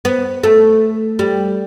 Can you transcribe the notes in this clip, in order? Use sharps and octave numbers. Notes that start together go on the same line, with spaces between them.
B3
A3
G3